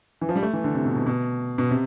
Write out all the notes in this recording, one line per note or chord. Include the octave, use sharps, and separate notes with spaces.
E3
F3
G3
A3
E3
D3
C3
B2
B2
B2
B2
C3